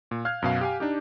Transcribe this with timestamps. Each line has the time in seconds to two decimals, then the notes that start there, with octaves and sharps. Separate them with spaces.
0.11 A#2
0.25 F5 F6 F#6 G#6
0.42 F#2 B2 F5
0.61 G4 F5 G#5
0.80 D4 D#4 G4